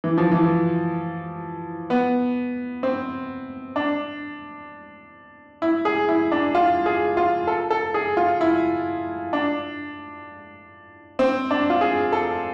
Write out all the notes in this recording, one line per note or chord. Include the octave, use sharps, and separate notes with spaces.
E3
F3
E3
B3
C4
D4
E4
G#4
E4
D4
F4
G#4
F4
A4
A4
G#4
F4
E4
D4
C4
D4
F4
G#4
A4